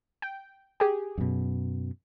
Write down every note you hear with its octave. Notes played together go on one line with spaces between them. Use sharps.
G5
G4 G#4
F#2 B2